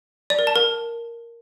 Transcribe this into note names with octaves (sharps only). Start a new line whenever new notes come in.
D5
A#4
A5
A#4